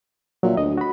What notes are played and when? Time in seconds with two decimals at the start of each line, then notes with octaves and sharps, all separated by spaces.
0.43 A#2 F#3 E5
0.57 D2 D#5
0.78 F#4 B5